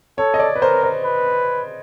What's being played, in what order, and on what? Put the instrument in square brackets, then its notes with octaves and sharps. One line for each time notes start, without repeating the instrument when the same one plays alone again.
[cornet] A4 [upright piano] C#5
[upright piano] D#5
D5
B4
[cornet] A#4 [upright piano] C5
[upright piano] C5
[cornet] B4